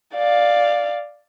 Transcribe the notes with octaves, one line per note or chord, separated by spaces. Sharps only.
D5 F5